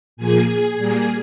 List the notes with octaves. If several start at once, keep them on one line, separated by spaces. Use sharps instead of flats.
A#2 F3 A#3 G#4 G#5
G#4 G#5
A#2 G3 A#3